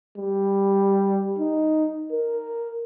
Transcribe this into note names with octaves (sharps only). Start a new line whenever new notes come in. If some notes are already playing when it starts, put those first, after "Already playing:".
G3
D#4
A#4